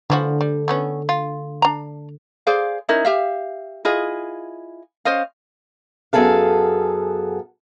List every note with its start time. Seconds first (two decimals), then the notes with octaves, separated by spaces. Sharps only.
0.10 D3 E3 F3 F#4
0.41 G3
0.68 A3 B3 C#4
1.09 F4
1.62 D4 A#5
2.47 G#4 C5 D5 F5
2.89 C#4 D#4 E4 A#4
3.05 G4 E5 F5
3.85 E4 F4 G#4 D#5
5.05 C#4 C5 D#5 F5
6.13 F#2 B3 G#4 A4 F5